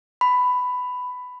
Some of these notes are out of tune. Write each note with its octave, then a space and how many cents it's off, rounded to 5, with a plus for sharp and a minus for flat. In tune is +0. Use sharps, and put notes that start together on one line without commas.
B5 +10